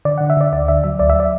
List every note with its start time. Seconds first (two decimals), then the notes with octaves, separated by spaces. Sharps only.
0.05 D3 D5
0.18 D3 F#5
0.30 E5
0.37 D3 D5
0.52 D2 D5
0.68 D3 E5
0.84 F#3 E5
0.99 D2 D5
1.10 E5
1.20 D5